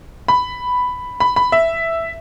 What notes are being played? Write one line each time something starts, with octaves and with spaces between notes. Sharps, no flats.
B5
B5
B5
E5